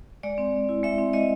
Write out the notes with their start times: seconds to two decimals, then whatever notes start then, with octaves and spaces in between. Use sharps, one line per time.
0.23 G#3 D5
0.38 C4
0.53 G#3
0.69 E4
0.83 G#3 E5
0.98 C4
1.13 G#3 D#5